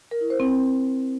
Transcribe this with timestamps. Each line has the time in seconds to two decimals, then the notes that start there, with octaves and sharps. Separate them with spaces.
0.11 A#4
0.21 E4
0.30 C5
0.40 C4